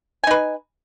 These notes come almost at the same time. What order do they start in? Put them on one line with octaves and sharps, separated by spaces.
G#5 D#4 B4